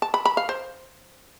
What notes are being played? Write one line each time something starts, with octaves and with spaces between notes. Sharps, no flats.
A5
B5
B5
F5
C5